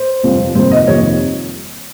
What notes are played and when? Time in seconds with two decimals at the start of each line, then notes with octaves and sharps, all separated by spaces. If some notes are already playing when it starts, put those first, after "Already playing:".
Already playing: C5
0.23 G1 F2 C3 F3 C4
0.55 F2 C3 D#3 G3 A#3 C5
0.71 D#5
0.87 F2 C3 D#3 G3 A#3 C#5